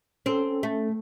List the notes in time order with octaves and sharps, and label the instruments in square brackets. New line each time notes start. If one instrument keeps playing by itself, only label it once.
[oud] C4 [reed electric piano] C#4 A4
[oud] A3